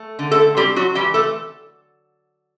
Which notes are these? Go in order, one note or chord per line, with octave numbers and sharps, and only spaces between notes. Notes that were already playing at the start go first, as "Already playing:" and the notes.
Already playing: A3
D3
A3 A4
G3 C4 G4
F#3 F#4
E3 G3 G4
A3 A4